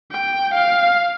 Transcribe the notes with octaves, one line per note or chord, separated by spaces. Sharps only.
G5
F5